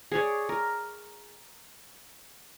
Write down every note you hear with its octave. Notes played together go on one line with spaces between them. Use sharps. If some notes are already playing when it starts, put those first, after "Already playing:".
G#4 C#5 D5
A#4